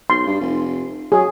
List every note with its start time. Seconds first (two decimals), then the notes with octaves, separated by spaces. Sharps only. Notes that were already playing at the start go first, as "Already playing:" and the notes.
0.10 B1 C6
0.27 G2
0.40 F1
1.12 F#3 G#4